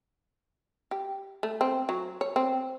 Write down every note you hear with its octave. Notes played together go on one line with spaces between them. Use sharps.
G4
A3
C4
F#3
C#5
C4